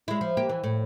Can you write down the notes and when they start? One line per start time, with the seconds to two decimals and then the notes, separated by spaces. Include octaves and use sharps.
0.08 G#3 E4
0.21 F3
0.37 A#3 G4
0.49 E3
0.64 A2